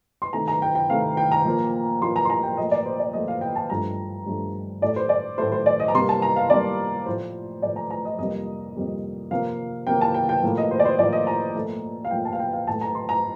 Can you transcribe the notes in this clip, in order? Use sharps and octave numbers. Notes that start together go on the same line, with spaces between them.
C6
C3 D#3 A3 A#5
A#5
G5
G5
C3 D#3 A3 F5
G5
A#5
A#2 F3 A#3
A#2 F3 A#3 C6
A#5
C6
A#5
G5
A#2 F3 A3 D#5
D5
C5
D5
A#2 F3 A3 D#5
F5
G5
A5
G2 F3 A3 A#5
G2 F3 A3
A2 A3 D5
C5
D5
A2 A3 C5
C5
D5
D#5
A#5
C3 G3 A#3 C6
A5
A#5
F5
C3 G3 A#3 D5
A2 F3 A3 C5
A2 F3 A3 D5
A#5
A#5
D#5
F2 C3 G3 A#3 D#5
F2 C3 G3 A#3
C3 F3 A#3 F5
C3 F3 A#3 G5
A5
G5
G5
A2 F3 A#3
D#5
C5
D5
C5
A2 F3 A#3 D5
D#5
A#5
A#2 F3 A3
F5
A#2 F3 A3 G5
A5
F5
G5
F5
A2 A3 A5
A#5
C6
A#5